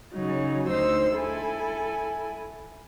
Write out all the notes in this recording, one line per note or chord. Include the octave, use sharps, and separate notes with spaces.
C#3 F#3 D#4
D2 D#4 C5 C6 E6
E4 A4 G#5